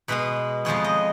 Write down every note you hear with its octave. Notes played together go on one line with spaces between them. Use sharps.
B2 G#3 B3 B4
F2 F3 G#3 B3 C#5
D#5